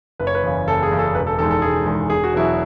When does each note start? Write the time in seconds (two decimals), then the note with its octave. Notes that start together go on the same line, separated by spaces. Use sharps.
0.20 F#1 B4
0.27 C#5
0.35 B4
0.43 E2 C#3
0.67 F#1 A4
0.83 G#4
0.91 E2 C#3
0.99 A4
1.15 E1 B4
1.27 A4
1.38 E2 D#3 G#3 A4
1.50 A4
1.62 E1 G#4
1.86 E2 D#3 G#3
2.09 E1 G#4
2.24 F#4
2.33 E2 B2 F#3 E4